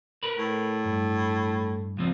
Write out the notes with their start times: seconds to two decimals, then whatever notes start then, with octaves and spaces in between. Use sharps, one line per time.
0.23 A#4 B4
0.39 A2
0.85 G2
1.97 C#2 F3 C4